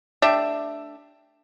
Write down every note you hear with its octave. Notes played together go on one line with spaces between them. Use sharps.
A3 D4 G4 E5